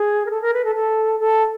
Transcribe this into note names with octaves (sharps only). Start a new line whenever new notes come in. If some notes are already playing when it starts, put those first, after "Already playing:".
Already playing: G#4
A#4
A4
A#4
B4
A4
A4
A4